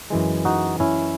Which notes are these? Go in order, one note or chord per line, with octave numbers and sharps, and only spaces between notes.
F#2 E3 G#3
D#4 F#4
C#4 E4